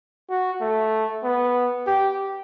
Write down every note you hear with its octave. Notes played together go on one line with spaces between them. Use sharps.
F#4
A3
B3
G4